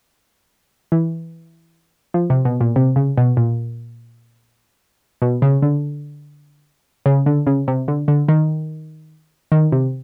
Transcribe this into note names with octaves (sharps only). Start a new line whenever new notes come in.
E3
F3
C3
B2
A#2
C3
C#3
B2
A#2
B2
C#3
D3
C#3
D3
C#3
C3
D3
D3
D#3
D#3
C3